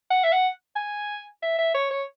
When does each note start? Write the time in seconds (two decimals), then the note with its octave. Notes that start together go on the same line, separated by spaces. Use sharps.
0.11 F#5
0.24 E5
0.32 F#5
0.76 G#5
1.43 E5
1.59 E5
1.74 C#5
1.91 C#5